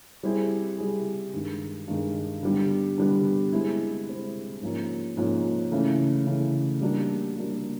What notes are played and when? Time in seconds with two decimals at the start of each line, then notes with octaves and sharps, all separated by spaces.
0.23 G3 C4 E4 G#4
0.78 G3 C4 E4 G#4
1.33 G2 D#3 G#3
1.88 G2 D#3 G#3
2.43 D3 G3 B3
2.98 D3 G3 B3
3.53 G#3 C4 E4
4.08 G#3 C4 E4
4.62 G#2 F3 A#3 C#4
5.17 G#2 F3 A#3 C#4
5.72 C#3 E3 A3
6.27 C#3 E3 A3
6.81 G3 A#3 D4 F#4
7.36 G3 A#3 D4 F#4